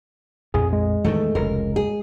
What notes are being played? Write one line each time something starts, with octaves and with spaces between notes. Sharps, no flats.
A#1 F2 A2 G#4
G#3
E2 A2 D#3 A3
F1 C#2 A#4
G#4